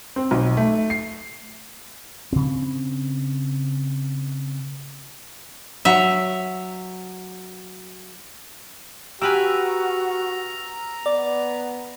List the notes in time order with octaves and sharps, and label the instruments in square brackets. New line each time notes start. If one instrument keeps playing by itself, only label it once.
[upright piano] C4
B1
A3
C7
[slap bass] C#3 C4
[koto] F#3 E5
[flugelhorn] F#4 [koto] G4 B4 G#5 [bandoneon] A#5 [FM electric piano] E6 F6
[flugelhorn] B3 [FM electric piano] D5